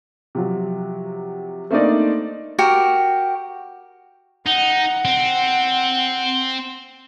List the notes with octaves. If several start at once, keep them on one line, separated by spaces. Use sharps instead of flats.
C3 F3 F#3
A3 A#3 C4 D4 D#4 D5
F#4 G4 A#4
D#4 F#5
C4